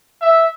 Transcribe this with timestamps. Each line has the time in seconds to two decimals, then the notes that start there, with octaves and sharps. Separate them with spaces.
0.21 E5